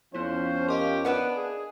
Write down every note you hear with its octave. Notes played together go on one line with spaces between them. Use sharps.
F2 F3 B3 C#4 E4 C5
G4 A#4 D#5 F5
B3 D4 B4 F#5
G#4